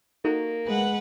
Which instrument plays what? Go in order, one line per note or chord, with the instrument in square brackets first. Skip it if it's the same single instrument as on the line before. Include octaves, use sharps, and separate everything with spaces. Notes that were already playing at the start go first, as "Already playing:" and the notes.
[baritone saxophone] A#3 [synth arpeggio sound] D#4 F#4 A4
[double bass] G#3 [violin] B4 F#5